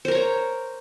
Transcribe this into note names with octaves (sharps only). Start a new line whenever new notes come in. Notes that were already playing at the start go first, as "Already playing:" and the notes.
A#4 C5 C#5 A#5